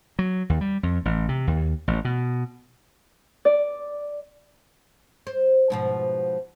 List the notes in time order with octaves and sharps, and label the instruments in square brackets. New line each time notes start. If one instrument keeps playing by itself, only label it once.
[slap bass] F#3
D#2
G3
F2
A1
C3
D#2
A1
B2
[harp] D5
[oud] C5
G#2 B2 F3